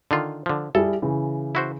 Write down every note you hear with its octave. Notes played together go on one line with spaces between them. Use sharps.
D3 D#3 F4
D3 F3
G3 E4 G#4 A4
C#3 E3
E4 F#4 C5